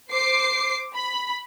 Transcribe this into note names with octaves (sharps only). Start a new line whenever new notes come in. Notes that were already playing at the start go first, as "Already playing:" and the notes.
C5 D6 C7
B5